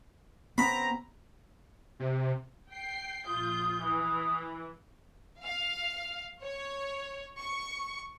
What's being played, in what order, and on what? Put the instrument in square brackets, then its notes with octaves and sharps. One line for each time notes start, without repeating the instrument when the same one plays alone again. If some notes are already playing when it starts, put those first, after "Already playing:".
[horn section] C#3 C4 A#5 [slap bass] B3 [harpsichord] B5
[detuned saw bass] C3
[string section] G5 C7
[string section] A#1 F4 G6 [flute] D#6
[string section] E3 [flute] D#6
[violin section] F5
C#5
C#6